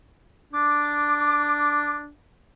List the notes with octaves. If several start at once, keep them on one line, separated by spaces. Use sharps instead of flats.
D4 D6